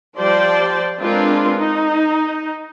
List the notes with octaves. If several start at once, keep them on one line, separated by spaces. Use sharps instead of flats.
F3 G3 C5 D5 G5 A5
G#3 C4 D4 F4 A#4 B4
D#4